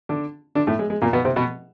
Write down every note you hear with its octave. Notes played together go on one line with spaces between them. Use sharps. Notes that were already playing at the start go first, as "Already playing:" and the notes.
D3 D4
D3 D4
A2 A3
G#3
G#3
A#2 A#3
B2 B3
C3 C4
B2 B3